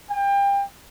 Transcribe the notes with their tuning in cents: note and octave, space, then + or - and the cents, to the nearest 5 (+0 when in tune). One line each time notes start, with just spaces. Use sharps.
G5 +30